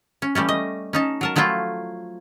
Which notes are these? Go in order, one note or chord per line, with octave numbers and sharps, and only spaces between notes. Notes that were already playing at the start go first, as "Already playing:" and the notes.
C#4
E3 G3 A3 C#4
D#5
C#4 D#4 A5
F#3 A#4 A5
F3 F#3 A3 E4 F4 G5